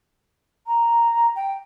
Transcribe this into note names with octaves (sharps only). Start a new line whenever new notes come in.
A#5
G5